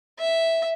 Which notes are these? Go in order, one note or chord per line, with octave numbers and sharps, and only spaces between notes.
E5